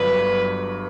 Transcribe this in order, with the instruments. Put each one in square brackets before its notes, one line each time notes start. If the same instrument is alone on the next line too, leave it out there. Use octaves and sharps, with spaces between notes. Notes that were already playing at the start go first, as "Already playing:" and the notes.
Already playing: [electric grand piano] G1 G2 F#3 [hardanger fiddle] B4